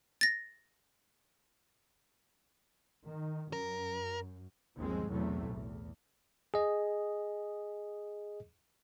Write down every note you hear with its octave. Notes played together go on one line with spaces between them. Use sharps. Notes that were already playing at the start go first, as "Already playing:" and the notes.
A6 A#6
D#3
F#2 A#4
G1 D#2 B2 F3 G#3 C4
B1 E2 A2 C3 F#3 A3
E2
G#4 D#5